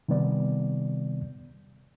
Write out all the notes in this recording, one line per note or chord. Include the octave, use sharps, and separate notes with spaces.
C3 D#3 G3 B3 D5